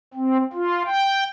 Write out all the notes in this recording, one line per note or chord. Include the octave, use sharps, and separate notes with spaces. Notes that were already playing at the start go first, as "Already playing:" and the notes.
C4
F4
G5